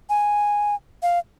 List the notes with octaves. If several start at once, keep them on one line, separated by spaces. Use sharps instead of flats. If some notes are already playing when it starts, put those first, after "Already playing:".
G#5
F5